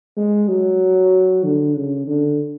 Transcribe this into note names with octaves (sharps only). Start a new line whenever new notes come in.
G#3
F#3
D3
C#3
D3